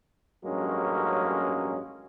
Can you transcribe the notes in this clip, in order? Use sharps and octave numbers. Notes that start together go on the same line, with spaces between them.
A1 G2 F#3 G#3 A#3 C#4